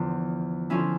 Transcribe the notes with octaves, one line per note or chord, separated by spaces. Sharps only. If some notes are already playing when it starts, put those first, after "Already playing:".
Already playing: E2 D3 F3
D3 F3 C#4 E4